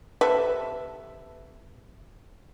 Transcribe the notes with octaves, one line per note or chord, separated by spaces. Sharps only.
C3 A4 B4 E5